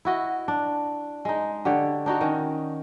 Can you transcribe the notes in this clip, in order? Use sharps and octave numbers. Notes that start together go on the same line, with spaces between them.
E4 F#4 D#5
D4
G#3 D#4
D3 G4 C#5
D4 D#4 F#4 C#5
D#3 C#4